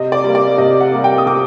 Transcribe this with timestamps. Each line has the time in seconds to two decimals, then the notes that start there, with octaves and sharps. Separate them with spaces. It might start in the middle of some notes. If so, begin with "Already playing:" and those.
Already playing: C3 D#5
0.12 D5
0.24 G3 A#3
0.35 D5
0.58 C3 D#5
0.81 F#5
0.92 G3 A#3
1.04 G5
1.18 D#6
1.26 C3 D6